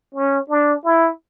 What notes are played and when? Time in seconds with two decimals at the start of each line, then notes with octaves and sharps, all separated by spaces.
0.14 C#4
0.49 D4
0.85 E4